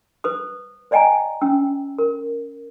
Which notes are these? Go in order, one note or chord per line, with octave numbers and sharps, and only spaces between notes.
B4 C5 D#6
C5 D5 D#5 G5 G#5 A#5
C#4 G5 E6
A#4